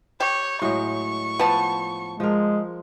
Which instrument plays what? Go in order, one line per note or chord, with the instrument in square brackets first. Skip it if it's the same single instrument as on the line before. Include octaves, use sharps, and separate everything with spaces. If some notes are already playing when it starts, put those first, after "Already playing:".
[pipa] G4 [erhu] C#5
[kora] A2 F#3 G#3 [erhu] C#6
[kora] F3 [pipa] B3 A5
[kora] F3 A#4 [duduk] G#3